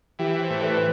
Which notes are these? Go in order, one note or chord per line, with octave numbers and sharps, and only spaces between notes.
E3 G4
C5
A2
B4